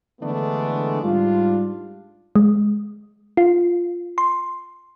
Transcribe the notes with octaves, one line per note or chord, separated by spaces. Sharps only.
D3 E3 G#3 A3 B3 D4
G#2 G3 D4 F4
G#3
F4
C6